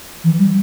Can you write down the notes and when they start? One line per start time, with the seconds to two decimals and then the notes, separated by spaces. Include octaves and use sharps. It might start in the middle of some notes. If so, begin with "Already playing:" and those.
0.24 E3
0.39 G3